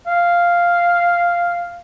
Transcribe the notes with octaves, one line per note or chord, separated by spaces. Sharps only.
F5